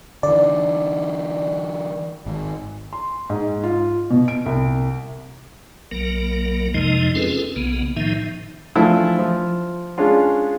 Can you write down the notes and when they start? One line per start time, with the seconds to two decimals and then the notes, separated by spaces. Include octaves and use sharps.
0.23 D3 E3 D5
2.26 G#1
2.93 C6
3.30 G#2
3.63 F4
4.10 B2
4.28 D7
4.46 C2
5.91 B1 F#3 A#3 A#4
6.74 F2 C3 F3 G#3 D#4 D#5
7.15 C4 C#4 F4 G#4 A4 B4
7.56 B1 C#3 A#3 B3
7.96 A2 D#3 F3 D#4 E5
8.75 E3 F3 A3 D4 E4 F4
9.19 F3
9.98 G#3 C#4 D4 F4